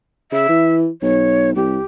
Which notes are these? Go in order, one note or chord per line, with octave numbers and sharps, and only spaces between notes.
C#3 E5
E3
B1 C#5
C2 G4